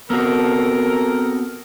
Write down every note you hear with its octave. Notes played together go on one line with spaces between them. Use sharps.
B3 C4 F#4 A4 A#4